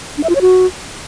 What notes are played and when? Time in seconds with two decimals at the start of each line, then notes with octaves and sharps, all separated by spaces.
0.18 D4
0.23 E5
0.29 F4
0.35 C#5
0.41 F#4